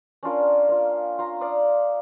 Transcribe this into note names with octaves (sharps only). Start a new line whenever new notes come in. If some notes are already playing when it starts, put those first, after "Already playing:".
C#4 D4 F4 A#4
A#3 F4
F4 A#5
D5 F5 D#6